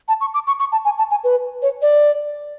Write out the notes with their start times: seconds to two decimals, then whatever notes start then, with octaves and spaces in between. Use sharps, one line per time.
0.08 A5
0.21 C#6
0.34 D6
0.47 C#6
0.60 C#6
0.72 A5
0.85 G#5
0.98 A5
1.11 G#5
1.24 B4
1.62 C#5
1.82 D5